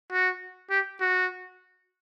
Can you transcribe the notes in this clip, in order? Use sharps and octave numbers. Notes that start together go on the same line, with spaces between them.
F#4
G4
F#4